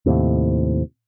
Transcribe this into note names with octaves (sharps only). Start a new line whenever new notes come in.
D#2 A2 C3